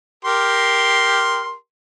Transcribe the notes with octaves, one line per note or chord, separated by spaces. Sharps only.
G4 A#4 C6